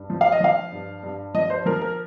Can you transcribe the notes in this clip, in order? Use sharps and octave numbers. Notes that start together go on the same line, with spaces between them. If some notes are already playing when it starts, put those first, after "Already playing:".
Already playing: G2
F3
F5
D#5
F3 F5
G2
G2
F3 D#5
C5
F3 A#4
A#4